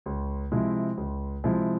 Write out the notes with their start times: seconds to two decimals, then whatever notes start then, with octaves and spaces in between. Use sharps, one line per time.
0.06 C#2
0.52 C3 F3 G#3 E4
0.97 C#2
1.44 C3 F3 G#3 E4